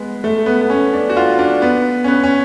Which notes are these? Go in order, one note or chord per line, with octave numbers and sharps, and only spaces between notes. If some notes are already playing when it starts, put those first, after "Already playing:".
Already playing: G#3 B3
A3
B3
B3
C#4
D4
F#4
F4
D4
B3
C#4
B3
C#4